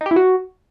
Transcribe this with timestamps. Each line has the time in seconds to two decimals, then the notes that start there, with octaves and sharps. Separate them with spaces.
0.01 D#4
0.06 G4
0.11 E4
0.16 F#4